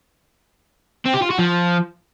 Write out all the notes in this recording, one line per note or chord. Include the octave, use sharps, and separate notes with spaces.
C4
G4
F4
F#4
F3